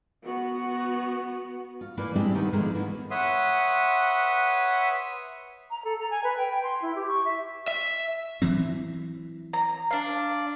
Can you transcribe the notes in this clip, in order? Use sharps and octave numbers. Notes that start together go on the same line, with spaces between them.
B3 F#4
F4
E3 A#3 B4 D5
G3 G#3 C4 D4 E4 G4
D#3 B3 C4
D3 D#3 F3 G#3 A#3
E3 A#3 B3
B4 C#5 E5 F#5 C6 D#6
A#5
A4
A#5
G#5
B4
G5
G5
C6
E4
G4
C#6
E5
E5
E3 F#3 C4
A#5
D4 F5